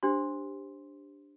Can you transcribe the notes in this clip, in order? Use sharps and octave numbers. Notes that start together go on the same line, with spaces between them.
D4 G4 C5 C6